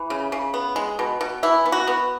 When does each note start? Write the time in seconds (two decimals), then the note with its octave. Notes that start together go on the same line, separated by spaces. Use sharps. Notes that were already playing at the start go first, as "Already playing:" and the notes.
Already playing: E3
0.10 C#3
0.32 C#3
0.54 B3
0.76 G#3
0.99 B2
1.21 B2
1.43 E3 E4
1.66 B3
1.72 F#4
1.87 B3